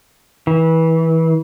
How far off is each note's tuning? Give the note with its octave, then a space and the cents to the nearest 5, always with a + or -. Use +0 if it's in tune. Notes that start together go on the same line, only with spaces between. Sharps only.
E3 -25